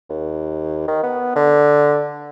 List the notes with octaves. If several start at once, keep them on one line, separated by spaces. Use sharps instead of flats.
D#2
D#3
B3
D3